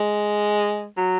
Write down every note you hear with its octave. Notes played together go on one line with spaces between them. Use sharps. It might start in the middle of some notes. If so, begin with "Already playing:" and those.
Already playing: G#3
F#3